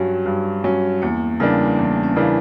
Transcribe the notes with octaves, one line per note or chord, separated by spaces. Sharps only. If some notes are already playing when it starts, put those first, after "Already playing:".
Already playing: G2 F#3 G3 C#4
G2
F#3 C#4
E2 A#3
C#3 E3 G3 A#3 D4
E2
C#4
C#3 E3 A#3 D4